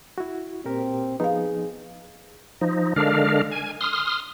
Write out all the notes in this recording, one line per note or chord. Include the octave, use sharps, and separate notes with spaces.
E4 F#4
A#2 C4 G4 A#4
F3 B3 D#4 G#4 B4 F5
F3 D#4
D3 G#3 D4 A#4 F5
G#5
C6 D#6 F6